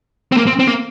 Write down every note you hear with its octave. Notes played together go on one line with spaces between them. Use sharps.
C4
A#3
C4
C4
A#3